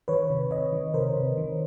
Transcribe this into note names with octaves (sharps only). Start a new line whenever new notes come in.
D#3 B4 C#5
C3
C3 C#5 D#5
D#3
C3 A#4 C5
C3
D#3